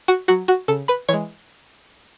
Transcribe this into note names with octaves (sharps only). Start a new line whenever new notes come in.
F#4 F#5
F#3 F#4 F#5
F#4 F#5
C#3 A4 A5
B4 B5
E3 G#3 C#5 C#6